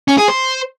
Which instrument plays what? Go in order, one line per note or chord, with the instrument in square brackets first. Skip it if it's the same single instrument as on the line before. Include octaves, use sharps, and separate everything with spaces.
[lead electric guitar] C#4
G#4
C5